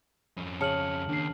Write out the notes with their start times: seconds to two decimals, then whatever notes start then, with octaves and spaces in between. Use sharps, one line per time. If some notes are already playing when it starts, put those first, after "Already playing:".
0.37 F2 C#4
0.61 C#3 A5 F6 C#7 F#7
1.09 D#2 D4 C7